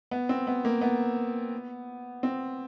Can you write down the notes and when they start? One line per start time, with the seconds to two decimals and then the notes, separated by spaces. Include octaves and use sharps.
0.11 B3
0.29 C4
0.47 B3
0.65 A#3
0.81 B3
2.23 C4